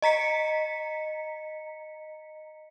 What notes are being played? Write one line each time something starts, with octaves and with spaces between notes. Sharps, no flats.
D#5 A#5 B6 C#7